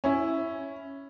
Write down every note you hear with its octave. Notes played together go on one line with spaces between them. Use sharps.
C#4 E4